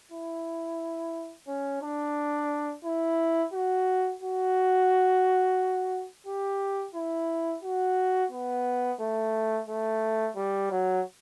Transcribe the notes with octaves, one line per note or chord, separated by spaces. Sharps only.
E4
C#4
D4
E4
F#4
F#4
G4
E4
F#4
B3
A3
A3
G3
F#3